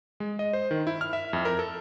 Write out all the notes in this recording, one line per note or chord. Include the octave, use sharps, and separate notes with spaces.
G#3
D#5
C5
D#3
E4
F6
E5
F2
A#4
A4